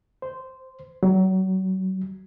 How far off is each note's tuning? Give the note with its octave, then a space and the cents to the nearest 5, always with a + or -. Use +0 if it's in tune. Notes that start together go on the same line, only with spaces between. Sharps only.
C5 -10
F#3 +30